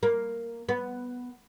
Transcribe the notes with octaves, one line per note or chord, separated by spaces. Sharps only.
A#3
B3